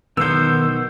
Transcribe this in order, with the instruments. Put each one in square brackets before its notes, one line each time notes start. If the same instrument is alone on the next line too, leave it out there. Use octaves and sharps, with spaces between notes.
[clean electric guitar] B1 B2 C5 [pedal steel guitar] D#3 B3 [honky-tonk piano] E6 G6